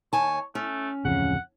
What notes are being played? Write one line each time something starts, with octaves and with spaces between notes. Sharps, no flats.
D#2 C#5 G#5 A5
A3 C#4
D1 F2 C#3 F#5